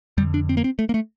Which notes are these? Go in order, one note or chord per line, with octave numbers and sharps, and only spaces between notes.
F2 D3 G3
D4
C4
A#3
C4
A3
A#3
A3